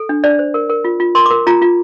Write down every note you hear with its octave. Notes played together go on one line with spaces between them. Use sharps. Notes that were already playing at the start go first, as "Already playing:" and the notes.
Already playing: A4
D4
D4 D5
C5
A#4
A#4
F4
F4
A#4 C6
D6
A#4
F4 A#5
F4